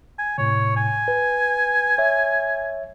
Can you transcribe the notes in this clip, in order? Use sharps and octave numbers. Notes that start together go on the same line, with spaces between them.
G#5
A2 C3 C#5
G#5
B4
C#5 E5